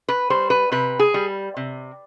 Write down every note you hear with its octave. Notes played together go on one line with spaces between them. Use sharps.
B4
G3 C5
B4
C3 B4
G#4
G3
C3